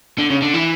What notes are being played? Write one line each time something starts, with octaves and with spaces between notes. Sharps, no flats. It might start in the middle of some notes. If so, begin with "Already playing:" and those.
D3
C#3
D3
E3